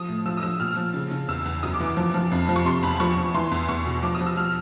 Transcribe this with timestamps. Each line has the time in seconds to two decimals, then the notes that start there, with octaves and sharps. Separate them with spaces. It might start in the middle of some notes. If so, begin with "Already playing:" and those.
Already playing: F3 D#6
0.08 A2
0.26 F3 E6
0.37 D#6
0.42 F3 E6
0.60 A#2 F6
0.76 F3
0.94 C#3
1.11 C#3
1.28 E2 E6
1.45 E2
1.63 F#2 D#6
1.74 D6
1.80 E3
1.86 D6
1.97 F3
2.14 F3
2.32 F2
2.49 F3
2.56 C#6
2.65 C3 C6
2.83 E2 B5
3.00 F3 C#6
3.17 F3
3.34 E3 C6
3.51 E2
3.69 E2 C#6
3.86 B2
4.03 F3 D6
4.15 D#6
4.21 F3
4.26 E6
4.37 F3 F6